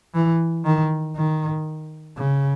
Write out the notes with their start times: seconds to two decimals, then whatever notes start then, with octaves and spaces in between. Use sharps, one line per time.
0.14 E3
0.65 D#3
1.16 D#3
2.17 C#3